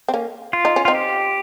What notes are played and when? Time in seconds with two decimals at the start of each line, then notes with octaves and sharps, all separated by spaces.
0.09 C4
0.14 A#3 C#4
0.53 F4
0.65 D#4
0.76 C#4
0.85 C4 D#4 F4
0.95 G4